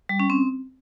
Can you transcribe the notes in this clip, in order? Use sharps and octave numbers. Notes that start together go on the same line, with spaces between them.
G3
C#4
C4